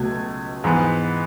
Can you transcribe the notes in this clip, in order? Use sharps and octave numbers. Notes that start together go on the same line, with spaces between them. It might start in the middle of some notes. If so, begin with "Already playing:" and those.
Already playing: C#2 B2 F#3 A3 G#6
G#2 E3 B3